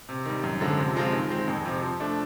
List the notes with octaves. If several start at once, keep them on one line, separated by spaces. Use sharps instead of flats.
C3
D#3 G3
F#2
D3 F3 G#3
C3
F3 G#3 C4 F4
D#3
G#3 C4
F2
C3 F3
F3
A3 D4